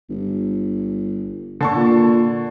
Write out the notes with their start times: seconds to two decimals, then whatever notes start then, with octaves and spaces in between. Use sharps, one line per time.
0.10 G1
1.61 D3 A5 C#6
1.76 A#2